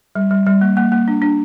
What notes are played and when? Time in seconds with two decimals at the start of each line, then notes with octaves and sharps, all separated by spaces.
0.15 G3
0.31 G3
0.46 G3
0.61 A#3
0.77 A#3
0.92 A#3
1.08 D4
1.22 D4